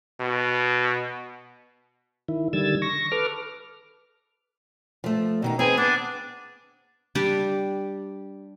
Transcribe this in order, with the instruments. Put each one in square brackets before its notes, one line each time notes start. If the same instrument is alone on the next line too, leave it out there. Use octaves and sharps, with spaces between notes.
[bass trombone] B2
[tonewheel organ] D#3 E4
D3 D#3 G3 E6 G#6 A6
C#6 A#6
A4 B4 D6 F6
[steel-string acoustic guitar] F3 A3
B2 D#3 D#4
[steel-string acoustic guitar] C4 B4 [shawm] G#4
[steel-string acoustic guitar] B3 [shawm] D4
[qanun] G3 D4 G4